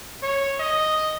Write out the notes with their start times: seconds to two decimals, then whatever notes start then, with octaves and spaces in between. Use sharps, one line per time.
0.23 C#5
0.60 D#5